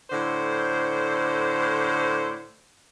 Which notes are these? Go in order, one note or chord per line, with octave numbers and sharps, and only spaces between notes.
A2 D3 C5